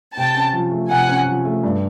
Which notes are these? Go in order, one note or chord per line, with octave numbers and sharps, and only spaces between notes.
C3 G5 A5
C#4
F3
A3
C3 F#5 G#5
C#4
F3
A3
G2